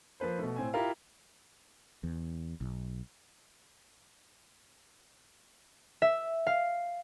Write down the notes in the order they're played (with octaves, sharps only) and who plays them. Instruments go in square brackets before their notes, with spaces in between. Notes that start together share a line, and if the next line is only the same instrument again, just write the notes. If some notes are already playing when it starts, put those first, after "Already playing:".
[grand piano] F3 A#3 B4 C5
B2 A3
A2 C4 G#5
E4 F4 G4 A#4 F5 A#5
[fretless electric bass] E2
B1
[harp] E5
F5